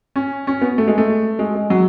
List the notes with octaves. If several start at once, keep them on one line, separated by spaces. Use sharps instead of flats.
C#4
C#4
B3
A3
G#3
A3
G#3
G#3
F#3